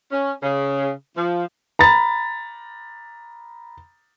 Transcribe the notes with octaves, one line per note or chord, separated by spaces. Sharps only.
C#4
C#3
F3
A#5 B5 A6